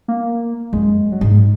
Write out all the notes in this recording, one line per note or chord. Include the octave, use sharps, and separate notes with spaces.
A#3
F#2 G#3
F#3
G#2 G#3